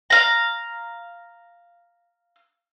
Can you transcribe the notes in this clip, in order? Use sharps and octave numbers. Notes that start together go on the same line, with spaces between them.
F5 A#5